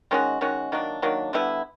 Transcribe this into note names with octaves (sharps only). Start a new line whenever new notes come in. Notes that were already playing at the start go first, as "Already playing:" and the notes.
D#3 G#3 C#4 F#4
D#3 G#3 C#4 F#4
D#3 F#3 A#3 D4
D#3 F#3 A#3 D4
D3 G3 B3 E4